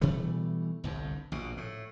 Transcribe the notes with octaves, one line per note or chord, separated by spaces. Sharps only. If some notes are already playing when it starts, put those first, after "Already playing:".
B2 E3 G3 A3
G1 C2 G2
A#1 B2
A2